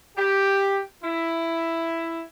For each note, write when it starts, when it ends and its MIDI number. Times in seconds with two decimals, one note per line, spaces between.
0.17 0.80 67
1.03 2.23 64